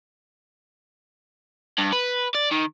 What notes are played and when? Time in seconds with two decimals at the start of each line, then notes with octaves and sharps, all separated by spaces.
1.78 G2
1.93 B4
2.35 D5
2.51 D#3